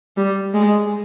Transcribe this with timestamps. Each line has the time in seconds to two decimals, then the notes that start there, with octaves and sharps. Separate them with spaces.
0.17 G3
0.54 G#3